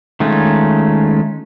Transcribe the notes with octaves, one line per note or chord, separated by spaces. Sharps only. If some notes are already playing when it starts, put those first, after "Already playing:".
D#3 G#3 A3 C#4 F4